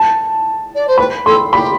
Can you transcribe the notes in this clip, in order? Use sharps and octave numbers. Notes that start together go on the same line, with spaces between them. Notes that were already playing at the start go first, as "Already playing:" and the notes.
Already playing: A5
D5
C5
B4 B5
A4 C6
G4 B5